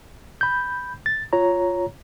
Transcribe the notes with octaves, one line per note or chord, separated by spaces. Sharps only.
B5 G6
A6
F4 C#5 A#5